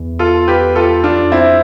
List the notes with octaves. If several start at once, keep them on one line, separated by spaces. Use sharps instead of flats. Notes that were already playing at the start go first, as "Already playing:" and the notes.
Already playing: E2
F4 A4
G4 B4
F4 A4
F2 D4 F4
C4 E4